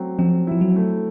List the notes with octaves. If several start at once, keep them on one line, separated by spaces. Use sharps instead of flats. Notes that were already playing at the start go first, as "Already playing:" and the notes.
Already playing: F#3 A3 C4
F3 C4
F3 E4
F#3
A3